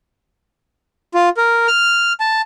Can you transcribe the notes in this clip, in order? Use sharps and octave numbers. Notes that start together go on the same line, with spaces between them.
F4
A#4
F6
A5